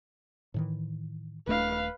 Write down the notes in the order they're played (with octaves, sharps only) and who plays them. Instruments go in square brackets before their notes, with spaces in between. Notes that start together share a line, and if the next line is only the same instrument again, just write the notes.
[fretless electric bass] A2 D#3 E3
[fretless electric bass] D#1 A3 D4 [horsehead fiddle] B4 F5